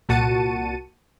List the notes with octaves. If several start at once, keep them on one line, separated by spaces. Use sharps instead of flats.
C2 A#2 F#4 A5 C#7 D#7